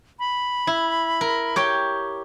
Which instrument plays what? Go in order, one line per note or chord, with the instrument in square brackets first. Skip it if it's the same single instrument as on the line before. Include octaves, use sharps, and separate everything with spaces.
[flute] B5
[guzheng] E4
A#4
G4 C#5 G5